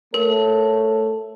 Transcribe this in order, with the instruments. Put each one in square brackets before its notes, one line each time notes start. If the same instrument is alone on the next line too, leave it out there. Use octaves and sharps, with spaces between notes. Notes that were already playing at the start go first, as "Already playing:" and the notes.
[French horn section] A3 A4 C#5 [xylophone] A#4